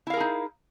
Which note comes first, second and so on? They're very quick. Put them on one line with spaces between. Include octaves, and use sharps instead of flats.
E4 F5 A#4 G#4 D#4